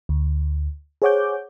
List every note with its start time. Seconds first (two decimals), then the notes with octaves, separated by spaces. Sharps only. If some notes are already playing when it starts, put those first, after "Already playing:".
0.09 D2
1.02 G#4 C5 C#5 F#5 D6 G6